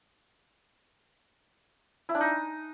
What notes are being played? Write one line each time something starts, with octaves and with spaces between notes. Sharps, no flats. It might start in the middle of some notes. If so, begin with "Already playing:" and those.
E4
D4
D#4